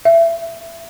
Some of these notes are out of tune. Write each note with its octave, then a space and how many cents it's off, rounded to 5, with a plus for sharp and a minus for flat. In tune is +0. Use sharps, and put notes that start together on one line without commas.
E5 +25